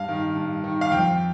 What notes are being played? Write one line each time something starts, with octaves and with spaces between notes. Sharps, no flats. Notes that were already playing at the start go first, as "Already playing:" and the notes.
Already playing: G2 F5
D#3
G2
D#3
F5
F2 G5